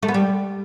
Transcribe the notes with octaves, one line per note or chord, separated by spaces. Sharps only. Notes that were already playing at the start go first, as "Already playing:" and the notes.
A3
B3
G3